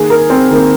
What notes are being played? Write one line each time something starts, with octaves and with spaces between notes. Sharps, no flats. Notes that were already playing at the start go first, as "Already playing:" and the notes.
Already playing: D#3 A#3 G#4
A#4
C4
D#3 A#3